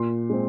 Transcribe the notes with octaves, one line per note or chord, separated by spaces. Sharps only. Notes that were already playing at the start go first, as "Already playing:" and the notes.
Already playing: A#2 C6
G#3 C4